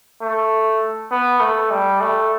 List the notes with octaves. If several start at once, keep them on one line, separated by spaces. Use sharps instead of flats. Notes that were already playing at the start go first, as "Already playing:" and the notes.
A3
B3
A3
G3
A3